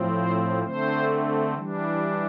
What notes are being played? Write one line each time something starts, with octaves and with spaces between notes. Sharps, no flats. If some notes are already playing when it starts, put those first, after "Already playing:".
Already playing: A2 F3 C4
C5
D3 A3 C4 C5
E3 G3 D4